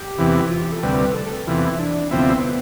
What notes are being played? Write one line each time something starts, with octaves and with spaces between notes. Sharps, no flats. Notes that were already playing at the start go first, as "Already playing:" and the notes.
Already playing: G4
E2 C3 E3
F4
G4
A4
D2 C3 G3 B4
A4
A4
E2 C3 E3 F4
E4
D4
D2 C3 F3 B3 C4 E4